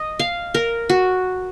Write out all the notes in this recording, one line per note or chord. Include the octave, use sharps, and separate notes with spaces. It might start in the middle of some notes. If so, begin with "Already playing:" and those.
Already playing: D#5
F5
A#4
F#4